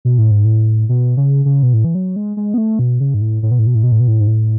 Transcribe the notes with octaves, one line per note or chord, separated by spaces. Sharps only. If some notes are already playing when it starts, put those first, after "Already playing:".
B2
A2
G#2
A2
B2
C#3
C#3
B2
A2
E3
F#3
G#3
G#3
B3
A3
B2
C#3
G#2
A2
A2
B2
A2
B2
A2
B2
A2
B2
A2
G#2
A2